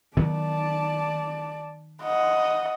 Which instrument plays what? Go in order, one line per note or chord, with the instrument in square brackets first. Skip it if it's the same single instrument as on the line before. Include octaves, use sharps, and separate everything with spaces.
[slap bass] D#3 F#3 B3 [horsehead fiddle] D5 A5
[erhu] D#5 [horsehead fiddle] F#5